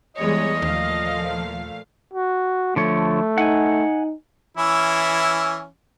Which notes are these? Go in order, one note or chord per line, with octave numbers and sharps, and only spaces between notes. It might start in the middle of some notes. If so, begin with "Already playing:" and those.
E2 G3 G#3 C#5 D#5
D#2 A#2 F3 A3 F5
F#4
D3 F3 A3 C#5
D#4 F#5 G#5
E3 C#4 E4